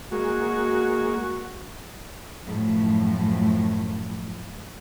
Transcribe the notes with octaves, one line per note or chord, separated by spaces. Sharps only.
G#3 A#3 F#4
F#2 A2 F3